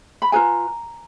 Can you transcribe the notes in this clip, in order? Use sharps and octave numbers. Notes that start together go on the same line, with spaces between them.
B5
F4 G#4 B4 G#5 A#5